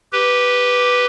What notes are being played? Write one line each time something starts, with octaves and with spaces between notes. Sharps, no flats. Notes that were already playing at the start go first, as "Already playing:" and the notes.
G4 B4